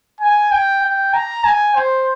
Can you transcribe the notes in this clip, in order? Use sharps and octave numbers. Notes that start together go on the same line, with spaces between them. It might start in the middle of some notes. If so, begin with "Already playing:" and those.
G#5
G5
G5
A#5
G#5
C5